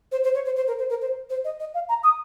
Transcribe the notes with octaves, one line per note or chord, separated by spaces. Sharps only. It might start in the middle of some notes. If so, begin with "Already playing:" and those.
C5
C5
C#5
C5
C5
A#4
C5
A#4
C5
C5
D#5
D#5
F5
A#5
D#6